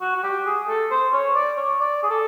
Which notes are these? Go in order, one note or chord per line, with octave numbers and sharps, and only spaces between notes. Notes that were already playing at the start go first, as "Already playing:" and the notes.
F#4
F#4
G4
G#4
A4
C5
C#5
D5
C#5
D5
G#4
A4